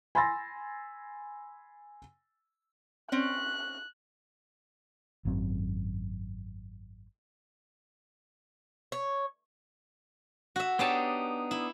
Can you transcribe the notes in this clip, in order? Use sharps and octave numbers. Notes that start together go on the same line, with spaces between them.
G#5 B5 C6 E6 A6 A#6
C4 C#4 F#6
G#1 F#2 F#3 C4
C#5
F#4 E5
B3 D4 D#4 G4 C#5 A5
E4